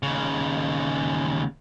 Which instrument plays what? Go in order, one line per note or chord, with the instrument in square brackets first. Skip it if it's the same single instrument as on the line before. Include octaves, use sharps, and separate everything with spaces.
[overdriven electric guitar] D#2 C#3